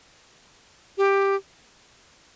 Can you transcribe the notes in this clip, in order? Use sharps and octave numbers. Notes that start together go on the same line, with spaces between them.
G4